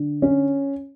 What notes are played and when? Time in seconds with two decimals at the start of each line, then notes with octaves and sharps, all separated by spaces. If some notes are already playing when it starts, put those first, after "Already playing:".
Already playing: D3
0.22 C#4